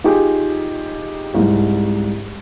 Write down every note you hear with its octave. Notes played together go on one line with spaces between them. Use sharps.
D#4 F4 G4 G#4
C2 G#2